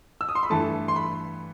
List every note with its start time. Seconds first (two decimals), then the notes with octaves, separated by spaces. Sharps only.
0.21 E6
0.29 D#6
0.35 C6
0.43 B5
0.50 G2 E3 A3 A5
0.88 C6
0.96 B5